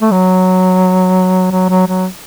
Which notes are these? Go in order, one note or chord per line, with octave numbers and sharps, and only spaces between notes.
A3
F#3
F#3
F#3
F#3